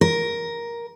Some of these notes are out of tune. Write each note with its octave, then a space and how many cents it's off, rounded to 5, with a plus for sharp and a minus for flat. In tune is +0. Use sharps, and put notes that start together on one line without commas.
A#4 +10